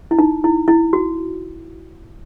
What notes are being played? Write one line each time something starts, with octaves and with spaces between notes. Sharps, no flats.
E4
D#4
E4
E4
F#4